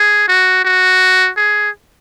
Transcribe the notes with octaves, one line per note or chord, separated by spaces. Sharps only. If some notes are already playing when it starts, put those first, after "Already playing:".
Already playing: G#4
F#4
F#4
G#4